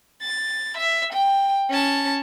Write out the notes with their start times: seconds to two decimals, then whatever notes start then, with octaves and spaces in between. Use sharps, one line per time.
0.22 A6
0.77 E5
1.13 G5
1.70 C#4 A5